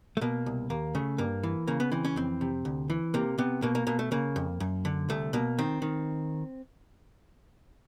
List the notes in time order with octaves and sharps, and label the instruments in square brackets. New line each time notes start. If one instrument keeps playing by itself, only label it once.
[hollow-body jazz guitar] A3
B2 A#3
C2
D#2 A#3
C#3 A3
G2 A#3
E3
C#3 A#3
B3
E3 C4
C#4
F2 C4
C3
D2
E3
C3 A#3
C3 B3
B2 A#3
A#3
B2 A#3
A3
C#3 A#3
F2
F#2
D3
C2 A3
B2 A#3
D#3 C4
D#3